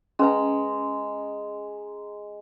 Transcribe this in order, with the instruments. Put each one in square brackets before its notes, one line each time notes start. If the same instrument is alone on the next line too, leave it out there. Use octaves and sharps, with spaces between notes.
[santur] G#3 A#5 [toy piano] C#4 B4